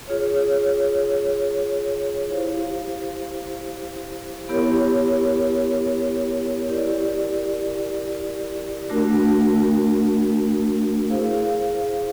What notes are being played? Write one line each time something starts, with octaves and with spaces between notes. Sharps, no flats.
F4 G#4 C#5
E4 G4 C5 F5
B3 E4 G4 A#4 C#5
E4 G4 A#4 D5
A3 D4 F#4 A#4
E4 G#4 C5 F5